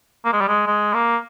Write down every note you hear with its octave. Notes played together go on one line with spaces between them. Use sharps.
A#3
G#3
G3
G#3
G#3
A#3